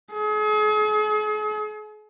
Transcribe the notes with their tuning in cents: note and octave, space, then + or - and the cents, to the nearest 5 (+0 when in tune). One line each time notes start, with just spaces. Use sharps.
G#4 +40